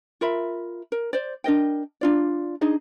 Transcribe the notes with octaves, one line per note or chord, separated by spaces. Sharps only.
F4 A#4 E5 B5
A#4
C5 D5
D4 A#4 D#5 G5
D4 F4 D5
D4 D#4 G#4 D#5